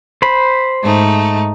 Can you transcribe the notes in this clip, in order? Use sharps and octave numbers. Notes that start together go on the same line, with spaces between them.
C5 B5
G#2 A3 D#4